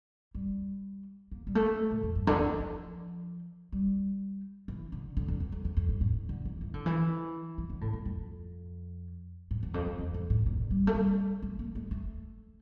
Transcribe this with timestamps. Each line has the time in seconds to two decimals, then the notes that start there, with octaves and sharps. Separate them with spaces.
0.35 G3
1.32 A#3
1.47 G3
1.55 A3
1.91 A#2
2.03 F2
2.15 G2
2.27 D3
2.43 E3
2.60 F3
3.72 G3
4.68 E3
4.92 D3
5.17 D3
5.28 F2
5.40 E2
5.52 F2
5.65 E2
5.77 F2
5.89 G2
6.01 A2
6.29 D3
6.45 E3
6.61 E3
6.74 D3
6.86 E3
7.58 E3
7.70 D3
7.81 A2
7.93 G2
8.05 F2
9.51 A2
9.63 E2
9.74 F2
9.86 E2
9.99 E2
10.14 F2
10.30 A2
10.46 A#2
10.71 G3
10.87 A3
10.95 G3
11.42 A3
11.59 A#3
11.75 A3
11.91 A3